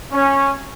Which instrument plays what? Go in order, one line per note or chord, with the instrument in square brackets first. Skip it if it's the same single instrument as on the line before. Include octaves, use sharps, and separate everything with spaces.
[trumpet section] C#4